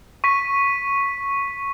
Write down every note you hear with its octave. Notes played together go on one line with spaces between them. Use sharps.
C#6 B6 D#7